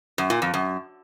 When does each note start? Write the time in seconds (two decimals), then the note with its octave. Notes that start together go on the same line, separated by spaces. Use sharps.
0.18 F#2
0.30 A#2
0.42 F2
0.54 F#2